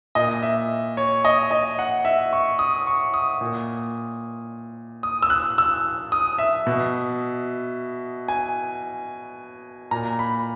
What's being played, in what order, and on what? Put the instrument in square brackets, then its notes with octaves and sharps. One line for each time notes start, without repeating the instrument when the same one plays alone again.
[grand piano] A#2 D#5
E5
C#5
D#5
D#5
F#5
E5
C#6
D#6
C#6
D#6
A#2
D#6
E6
F#6
E6
D#6
E5
B2
G#5
A#2 A#5
B5